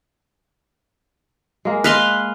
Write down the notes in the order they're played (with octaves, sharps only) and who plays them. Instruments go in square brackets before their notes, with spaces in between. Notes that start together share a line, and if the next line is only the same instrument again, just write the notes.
[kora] G#3 A#3
[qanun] B4 F5 C6 [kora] D#5